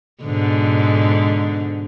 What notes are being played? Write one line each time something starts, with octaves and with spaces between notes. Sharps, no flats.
G#2 B2 D3